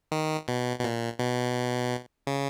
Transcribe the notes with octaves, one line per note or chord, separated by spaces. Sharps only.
D#3
B2
B2
A#2
B2
C#3